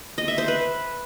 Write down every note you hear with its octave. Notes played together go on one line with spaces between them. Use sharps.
D#5
E5
C5
B4